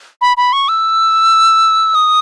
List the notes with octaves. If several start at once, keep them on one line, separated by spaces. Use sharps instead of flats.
B5
B5
C#6
E6
D#6